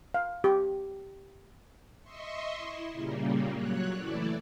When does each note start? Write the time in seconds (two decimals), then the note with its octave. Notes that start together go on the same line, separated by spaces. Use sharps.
0.14 F5
0.44 G4
2.02 D#5 E5 C6 C#6
2.57 E4
2.92 A#2 C#3 G3 A#3
3.51 F#3 C#5 F#6
3.93 E3 A3 E4 D5